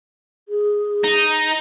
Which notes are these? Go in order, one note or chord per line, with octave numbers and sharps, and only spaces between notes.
G#4
D#4